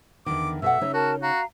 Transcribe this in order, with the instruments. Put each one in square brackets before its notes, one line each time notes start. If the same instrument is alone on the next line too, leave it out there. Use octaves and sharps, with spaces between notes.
[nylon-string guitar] E2 D3 D#3 [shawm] D6
[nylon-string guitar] B2 A4 F#5 [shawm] E5
[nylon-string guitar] C#3 D#4 C#5
[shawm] F#4 [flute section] A#4 A5
[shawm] F#4 [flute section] F5 A#5